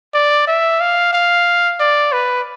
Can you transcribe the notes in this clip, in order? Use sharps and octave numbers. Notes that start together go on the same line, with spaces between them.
D5
E5
F5
F5
D5
B4